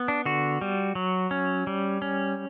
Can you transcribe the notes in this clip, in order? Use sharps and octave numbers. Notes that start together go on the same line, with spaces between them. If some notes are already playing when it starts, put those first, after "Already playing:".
Already playing: B3
D4
D3 F#4
G3
F#3
C#4
G3
C#4